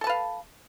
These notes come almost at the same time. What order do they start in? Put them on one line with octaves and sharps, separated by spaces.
A4 A5 B4 F5